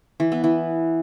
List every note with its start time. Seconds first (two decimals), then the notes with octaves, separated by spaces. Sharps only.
0.20 E3
0.32 B3
0.44 E3